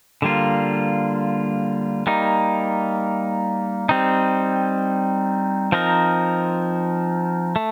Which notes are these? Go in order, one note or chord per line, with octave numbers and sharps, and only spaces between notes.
D3 G3 A#3 F4
G3 A#3 D#4
G3 C4 D#4
F3 C4 D#4 A#4
A3